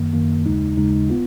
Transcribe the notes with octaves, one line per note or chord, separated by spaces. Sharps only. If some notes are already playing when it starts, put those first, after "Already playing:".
Already playing: F#2 D#3 A#3
F#2 D#3 A#3
D#2 C#3 G#3 D#4
D#2 C#3 G#3 D#4
B3 F4